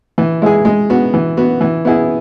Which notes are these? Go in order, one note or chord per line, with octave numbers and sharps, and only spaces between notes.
E3
G#3 E4 G#4
G#3
B3 F#4
E3
B3 F#4
E3
B3 E4 G#4